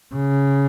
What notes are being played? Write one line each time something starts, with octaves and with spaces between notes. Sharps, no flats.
C#3